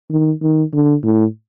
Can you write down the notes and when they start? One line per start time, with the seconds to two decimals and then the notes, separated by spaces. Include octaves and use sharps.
0.10 D#3
0.42 D#3
0.73 D3
1.03 A2